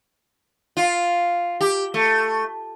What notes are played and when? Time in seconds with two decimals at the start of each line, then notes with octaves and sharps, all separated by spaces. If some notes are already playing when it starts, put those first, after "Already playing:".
0.77 F4
1.61 G4
1.94 A3